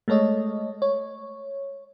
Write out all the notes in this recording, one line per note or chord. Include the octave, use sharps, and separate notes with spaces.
G#3 A3 A4 C#5 D#5
C#5